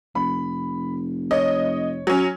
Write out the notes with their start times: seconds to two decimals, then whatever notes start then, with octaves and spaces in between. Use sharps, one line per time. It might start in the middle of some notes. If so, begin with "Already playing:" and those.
0.15 F1 B5
1.31 C#5 D#5
2.07 F#3 C#4